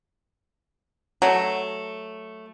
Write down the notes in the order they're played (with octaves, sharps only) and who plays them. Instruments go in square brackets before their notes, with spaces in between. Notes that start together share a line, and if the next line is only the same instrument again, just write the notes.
[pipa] F#3 A3